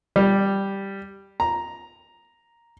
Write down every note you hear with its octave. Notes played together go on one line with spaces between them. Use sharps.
G3
A#5